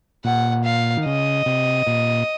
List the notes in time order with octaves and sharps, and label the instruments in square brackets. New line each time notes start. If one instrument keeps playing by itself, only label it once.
[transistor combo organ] A#2 [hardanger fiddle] F#5
[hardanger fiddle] F5
[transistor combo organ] D#3
[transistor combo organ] C#3 [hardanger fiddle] D#5
[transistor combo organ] C3
A#2